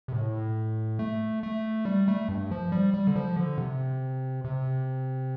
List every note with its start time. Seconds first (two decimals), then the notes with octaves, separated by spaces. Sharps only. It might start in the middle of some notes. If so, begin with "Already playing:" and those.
0.08 C3
0.13 A2
0.99 A3
1.43 A3
1.85 G3
2.08 A3
2.28 G2
2.51 F3
2.72 G3
2.94 G3
3.07 D3
3.16 F3
3.36 D3
3.58 C3
4.44 C3